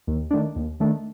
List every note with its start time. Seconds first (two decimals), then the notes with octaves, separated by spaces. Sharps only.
0.07 D#2
0.31 D#3 A3 D4
0.56 D#2
0.80 D#3 A3 D4